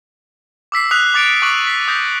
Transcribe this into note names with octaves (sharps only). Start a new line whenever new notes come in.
D6 E6 B6 C7
D#6 F#6 B6 C7 F7
D6 A6 C#7 D7
C#6 D6 F#6 F#7
B6 C7
D#6 G6 A#6 B6